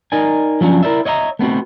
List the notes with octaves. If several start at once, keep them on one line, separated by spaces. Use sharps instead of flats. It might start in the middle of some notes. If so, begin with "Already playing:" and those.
D#4 A#4 D5 G#5
F3 F#3 A3 C#4 D4
E4 A#4 C5 D5 E5
C#5 D#5 E5 F#5 A#5
A3 B3 C4 F#4